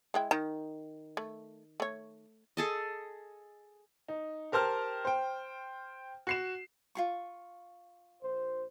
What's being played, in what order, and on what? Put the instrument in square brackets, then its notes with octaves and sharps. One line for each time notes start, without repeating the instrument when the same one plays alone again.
[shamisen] G#3 E4 G5
[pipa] D#3 [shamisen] A#5
[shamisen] A3
A3 C#5
[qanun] G#4 A4 D#5
[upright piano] D#4
G4 A#4 C5 A5 F6
C5 G5
F#4 C7 E7
[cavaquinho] F4 G#4 C#6
[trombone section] A#1 C5